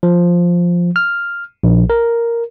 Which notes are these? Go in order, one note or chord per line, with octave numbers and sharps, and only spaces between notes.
F3
F6
A#1
A#4